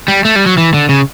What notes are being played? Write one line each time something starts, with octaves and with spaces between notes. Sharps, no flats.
G3
A3
G3
F#3
E3
D3
C#3